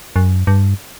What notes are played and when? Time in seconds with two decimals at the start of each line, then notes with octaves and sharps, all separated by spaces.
0.16 F#2
0.47 G2